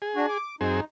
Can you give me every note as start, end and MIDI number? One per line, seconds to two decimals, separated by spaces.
0.02 0.38 68
0.16 0.26 62
0.16 0.26 66
0.29 0.55 86
0.61 0.80 42
0.61 0.80 60
0.61 0.85 63
0.61 0.80 68